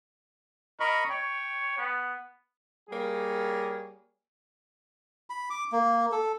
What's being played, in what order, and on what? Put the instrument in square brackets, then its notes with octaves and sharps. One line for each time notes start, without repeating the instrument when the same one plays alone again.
[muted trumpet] A#4 [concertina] D#5 B5 C#6
[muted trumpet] C#5 [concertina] G5
[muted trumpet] B3
[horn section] G3 A#3 G#4 C#5
[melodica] B5
D6
A#3
A4